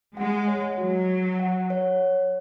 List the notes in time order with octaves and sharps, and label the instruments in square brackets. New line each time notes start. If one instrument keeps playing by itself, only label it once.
[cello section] G#3 [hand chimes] F#5
[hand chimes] C#5
[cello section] F#3 [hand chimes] F#4
[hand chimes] F#4
F#5
C#5